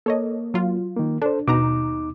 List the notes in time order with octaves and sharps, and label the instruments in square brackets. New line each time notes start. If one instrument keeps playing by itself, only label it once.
[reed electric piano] A#3 [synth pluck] A4 C#5 D#5
[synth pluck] F#3 F4
[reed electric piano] D#3 A#3
[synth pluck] D4 [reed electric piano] A4 C5
[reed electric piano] D#2 D#4 D6 [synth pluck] B2 A#5